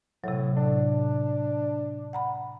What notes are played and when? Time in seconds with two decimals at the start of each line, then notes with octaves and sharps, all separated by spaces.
0.24 A2 C3 F#3
0.57 A2 D4
2.13 F#5 A#5 B5